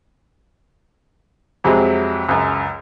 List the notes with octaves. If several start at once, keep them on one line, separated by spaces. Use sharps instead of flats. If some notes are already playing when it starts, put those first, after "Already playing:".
F2 C3 F#3 G#3
C#2 F#2